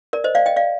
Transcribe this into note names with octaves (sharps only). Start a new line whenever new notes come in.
A#4 D5
C5 D#5
D5 F5
D#5 G5
D5 F5